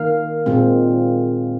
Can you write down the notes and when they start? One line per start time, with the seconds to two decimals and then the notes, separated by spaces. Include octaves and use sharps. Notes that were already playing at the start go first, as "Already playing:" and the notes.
Already playing: D#3 A#3 F5
0.46 A#2 G#3 C4